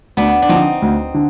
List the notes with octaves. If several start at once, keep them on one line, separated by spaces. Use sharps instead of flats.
D2 B3 D4
D4
D3 F3 C4 D#4
D2
D3